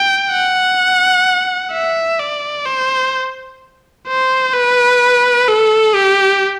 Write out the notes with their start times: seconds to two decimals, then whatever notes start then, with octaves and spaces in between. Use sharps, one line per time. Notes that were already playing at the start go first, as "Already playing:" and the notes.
Already playing: G5
0.31 F#5
1.72 E5
2.20 D5
2.66 C5
4.08 C5
4.54 B4
5.49 A4
5.95 G4